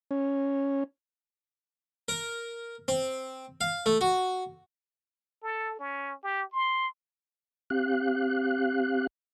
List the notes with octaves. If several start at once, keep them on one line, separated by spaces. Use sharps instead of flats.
C#4
A#4
C4
F5
A3
F#4
A4
C#4
G4
C6
C4 G4 F5 F#6